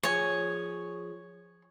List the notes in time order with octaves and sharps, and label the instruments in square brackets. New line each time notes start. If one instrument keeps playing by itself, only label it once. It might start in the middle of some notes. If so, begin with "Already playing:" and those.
[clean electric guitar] F3 G#4 [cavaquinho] C#5 G#5